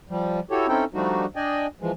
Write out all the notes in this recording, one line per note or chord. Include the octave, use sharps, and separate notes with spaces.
F3 G3
E4 F#4 G4 A4 C#5
C4 C#4 D#4 E4 A4 G5
F3 G3 A3 D4 D#4 F#4
D4 D5 D#5 G5 G#5
E3 F3 G#3